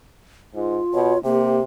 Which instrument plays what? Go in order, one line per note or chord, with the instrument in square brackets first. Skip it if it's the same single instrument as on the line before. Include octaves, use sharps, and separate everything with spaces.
[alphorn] G#2 [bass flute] F4
[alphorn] B2 [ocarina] C#5
[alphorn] C3 [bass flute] A#3 [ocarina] G4